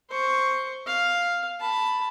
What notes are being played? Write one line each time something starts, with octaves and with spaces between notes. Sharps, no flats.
C5 C#6
F5
A5 B5